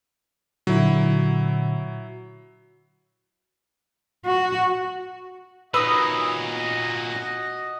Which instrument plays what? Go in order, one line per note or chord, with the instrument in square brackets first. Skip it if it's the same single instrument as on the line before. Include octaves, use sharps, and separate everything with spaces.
[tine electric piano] A#2 D3 [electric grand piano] F#3 E4
[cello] F#4
[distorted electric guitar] A#2 C#4 [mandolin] D#4 D#6 E6 [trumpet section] F#4 D#5 [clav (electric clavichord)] B4